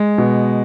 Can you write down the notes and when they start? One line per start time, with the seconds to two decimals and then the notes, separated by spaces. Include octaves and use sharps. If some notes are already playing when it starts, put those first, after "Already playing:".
Already playing: G#3
0.18 B2